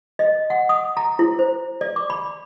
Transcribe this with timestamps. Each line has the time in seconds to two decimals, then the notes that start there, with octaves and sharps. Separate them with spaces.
0.19 D#5
0.50 F#5
0.69 D#6
0.97 A#5
1.19 E4
1.39 C5
1.81 D5
1.96 D6
2.10 B5